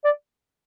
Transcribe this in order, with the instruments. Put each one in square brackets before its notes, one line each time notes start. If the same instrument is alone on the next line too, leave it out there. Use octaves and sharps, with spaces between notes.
[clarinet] D5